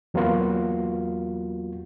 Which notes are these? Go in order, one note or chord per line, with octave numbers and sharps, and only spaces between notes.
E2 F#3 A#3 B3 F4 F#4